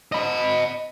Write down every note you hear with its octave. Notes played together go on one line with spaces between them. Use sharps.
D#5 B5